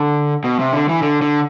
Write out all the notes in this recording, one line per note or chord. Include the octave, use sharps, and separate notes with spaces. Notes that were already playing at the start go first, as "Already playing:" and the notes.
Already playing: D3
B2
C3
D3
E3
D3
D3